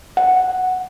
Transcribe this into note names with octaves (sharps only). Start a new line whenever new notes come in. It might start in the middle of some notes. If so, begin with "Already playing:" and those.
F#5